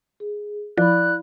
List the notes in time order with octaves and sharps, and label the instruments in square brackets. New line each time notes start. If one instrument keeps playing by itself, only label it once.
[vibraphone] G#4
[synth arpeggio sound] F3 [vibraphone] E4 F5 B5 [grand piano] D5 [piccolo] F#6